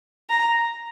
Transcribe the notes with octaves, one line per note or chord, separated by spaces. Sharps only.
A#5